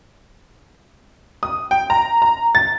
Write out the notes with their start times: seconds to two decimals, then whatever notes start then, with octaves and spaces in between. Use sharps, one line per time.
1.43 D#6
1.71 G5
1.90 A#5
2.22 A#5
2.55 A6